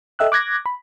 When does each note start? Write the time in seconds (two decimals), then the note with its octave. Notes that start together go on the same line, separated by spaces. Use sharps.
0.19 A4 D#5 E5 G5 E6 F#6
0.32 D6 F#6 G#6 A#6
0.66 B5